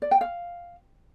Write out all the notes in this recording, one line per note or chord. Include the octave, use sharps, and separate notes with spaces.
D5
G5
F5